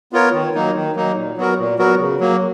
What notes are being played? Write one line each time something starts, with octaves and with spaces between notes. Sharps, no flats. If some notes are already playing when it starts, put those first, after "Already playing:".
B3 F4 A#4 C#5
D#3
F#3 A#3 D#4
D#3
F#3 A#3 D#4
A#2
F#3 B3 F#4 A#4
A#2
F#3 B3 F#4 A#4
C#3
F#3 A#3